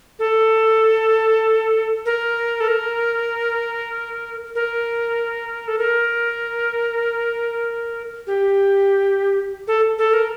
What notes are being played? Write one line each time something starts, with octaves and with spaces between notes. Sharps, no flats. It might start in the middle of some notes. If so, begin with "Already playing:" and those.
A4
A#4
A4
A#4
A#4
A4
A#4
G4
A4
A4
A#4